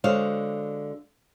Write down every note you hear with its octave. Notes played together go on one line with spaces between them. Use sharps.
D3 G#3 F#4 C5 C#5 F5